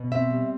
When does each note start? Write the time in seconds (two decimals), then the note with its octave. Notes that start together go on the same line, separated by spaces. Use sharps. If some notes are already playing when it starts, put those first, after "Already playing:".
Already playing: B2
0.12 C4 E5
0.30 G3